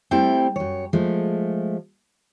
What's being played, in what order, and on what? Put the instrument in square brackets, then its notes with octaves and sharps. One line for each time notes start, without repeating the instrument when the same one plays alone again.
[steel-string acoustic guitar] G3 A3 C4 E4 G5
F#2 C#5
F3 G#3 A3